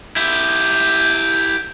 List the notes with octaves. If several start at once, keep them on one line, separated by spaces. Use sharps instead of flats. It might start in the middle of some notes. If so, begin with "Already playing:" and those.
E4 G4